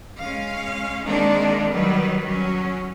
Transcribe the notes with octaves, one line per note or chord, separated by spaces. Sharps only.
G#3 C#4 F5
D#3 G#3 A#3 C4 D4 D#4
D#3 F#3 G3 B4
F#3 C#4